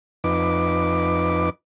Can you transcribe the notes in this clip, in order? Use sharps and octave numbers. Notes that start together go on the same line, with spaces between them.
F2 D#4 B4 D6